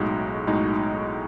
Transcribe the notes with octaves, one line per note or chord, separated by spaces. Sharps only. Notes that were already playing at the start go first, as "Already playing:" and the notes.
Already playing: B1 A2 G#3 D#4 F#4
B1 A2 G#3 D#4 F#4